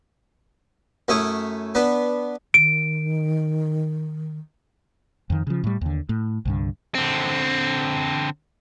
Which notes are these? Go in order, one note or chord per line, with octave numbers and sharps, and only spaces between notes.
F#2 A3 E4 C#5 D#6
B3 D4 B4
D#3 D7
F2 D#3
C#3 F3
A2 G3
D#2 D3
A2
C2 G2 D3
D3 C4